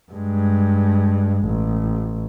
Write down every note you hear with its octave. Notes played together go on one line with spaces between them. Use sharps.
G2 G#3
A1